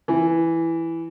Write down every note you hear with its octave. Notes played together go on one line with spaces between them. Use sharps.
E3